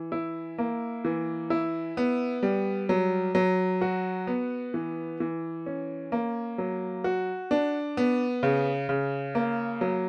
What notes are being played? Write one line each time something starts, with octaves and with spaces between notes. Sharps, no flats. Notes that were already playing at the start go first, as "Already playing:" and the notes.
Already playing: E3
E4
A#3
E3
E4
B3
G3
F#3
F#3
F#4
B3
E3
E3
C#4
A#3
F#3
F#4
D4
B3
C#3
C#3
A#3
F#3